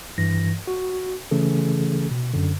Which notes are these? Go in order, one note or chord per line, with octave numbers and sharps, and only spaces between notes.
G2 E3 A#6
F#4
C#3 E3 A3 C#4 G#4 A4
B2
F#2 D3